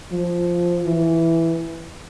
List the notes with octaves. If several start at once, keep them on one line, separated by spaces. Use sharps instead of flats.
F3
E3